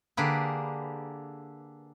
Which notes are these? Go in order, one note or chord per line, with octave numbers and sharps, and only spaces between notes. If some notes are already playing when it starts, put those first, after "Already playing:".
D3 A#3 G4 G#4 B4